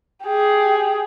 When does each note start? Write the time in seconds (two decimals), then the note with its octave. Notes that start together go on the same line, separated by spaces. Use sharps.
0.24 G4 G#4